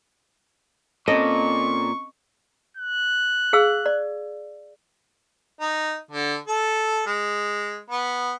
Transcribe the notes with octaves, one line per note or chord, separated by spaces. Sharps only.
A#2 C4 C#4 A4 D#5 C#6
F#6
G#4 F5 E6
D5
D#4
D3
A4
G#3
B3